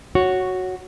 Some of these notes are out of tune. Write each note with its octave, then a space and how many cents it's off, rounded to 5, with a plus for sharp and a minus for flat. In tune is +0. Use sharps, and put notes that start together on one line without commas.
F#4 +0 C#5 +0